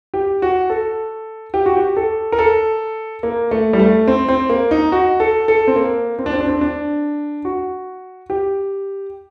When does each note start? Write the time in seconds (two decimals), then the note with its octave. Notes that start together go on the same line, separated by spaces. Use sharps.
0.14 G4
0.42 F#4
0.70 A4
1.54 G4
1.66 F#4
1.77 G4
1.97 A4
2.32 A#4
2.39 A4
3.23 A#3
3.51 A3
3.73 G3
3.79 A3
4.07 C4
4.29 C4
4.49 A#3
4.71 D#4
4.92 F#4
5.20 A4
5.48 A4
5.67 C4
5.76 A#3
6.19 C4
6.26 D4
6.33 C4
6.41 D4
6.48 C4
6.61 D4
7.45 F#4
8.30 G4